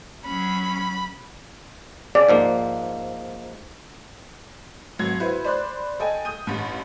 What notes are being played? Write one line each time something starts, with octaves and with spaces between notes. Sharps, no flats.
F#3 C#4 B5
C#3 D5
G#2 F3 A#3
G#1 F#3 G#6
E4 F#4 B4 C5
C5 D5 B5 C6 F#6
A4 D#5 G5 G#5
D#6 G6 D#7
A1 G2